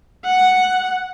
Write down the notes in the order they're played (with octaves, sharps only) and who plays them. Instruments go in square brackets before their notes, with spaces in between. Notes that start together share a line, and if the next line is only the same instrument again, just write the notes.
[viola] F#5